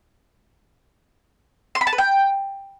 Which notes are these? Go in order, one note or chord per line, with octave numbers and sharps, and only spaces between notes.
C6
B5
A5
B4
G5